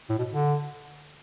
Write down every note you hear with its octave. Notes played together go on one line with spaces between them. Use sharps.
A2
B2
D3